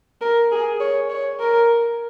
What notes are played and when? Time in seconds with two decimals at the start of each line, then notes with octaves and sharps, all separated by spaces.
0.21 A#4
0.52 G#4
0.80 C#5
1.10 C#5
1.40 A#4